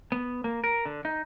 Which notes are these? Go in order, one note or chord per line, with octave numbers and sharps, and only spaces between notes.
B3
A#3
A#4
D3
D#4